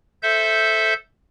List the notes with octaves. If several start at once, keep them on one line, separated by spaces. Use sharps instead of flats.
A4 C5 E5 G6